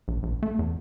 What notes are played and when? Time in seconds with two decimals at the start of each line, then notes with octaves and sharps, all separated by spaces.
0.08 A#1
0.23 A#1
0.43 A3
0.59 E2